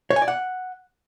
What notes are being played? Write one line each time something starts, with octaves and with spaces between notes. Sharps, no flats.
C#5
G#5
D5
F#5